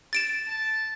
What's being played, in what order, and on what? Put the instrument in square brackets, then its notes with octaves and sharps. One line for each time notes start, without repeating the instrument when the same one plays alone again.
[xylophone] A6 D7 E7
[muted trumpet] A5